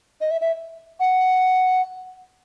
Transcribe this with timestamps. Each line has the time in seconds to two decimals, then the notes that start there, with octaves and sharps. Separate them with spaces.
0.21 D#5
0.31 E5
0.41 E5
1.00 F#5